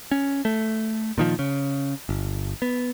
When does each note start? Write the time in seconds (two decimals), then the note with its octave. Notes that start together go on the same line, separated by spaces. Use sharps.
0.11 C#4
0.45 A3
1.18 A#2 D#3 F3
1.39 C#3
2.09 G1
2.62 B3